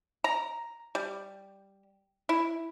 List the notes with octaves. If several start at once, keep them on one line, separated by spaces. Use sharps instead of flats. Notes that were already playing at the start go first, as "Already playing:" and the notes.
A#5
G3
E4